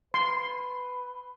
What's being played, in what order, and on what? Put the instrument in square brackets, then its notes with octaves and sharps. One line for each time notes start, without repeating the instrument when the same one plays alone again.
[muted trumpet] B4 [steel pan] C6